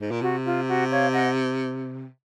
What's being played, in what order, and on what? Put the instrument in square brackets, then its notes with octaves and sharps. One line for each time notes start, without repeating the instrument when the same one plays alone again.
[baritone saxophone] G#2
A#2
[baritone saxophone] C3 [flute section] F#4
[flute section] F4
F#4
C#5 F5
D#5 F#5